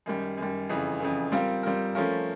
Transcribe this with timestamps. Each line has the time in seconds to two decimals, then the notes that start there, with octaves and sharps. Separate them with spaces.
0.06 F#2 D#3 G3
0.38 F#2 D#3 G3
0.70 F2 C#3 E3
1.00 F2 C#3 E3
1.32 G3 C4 F4 A#4
1.63 G3 C4 F4 A#4
1.95 F3 A3 C#4 F4 A#4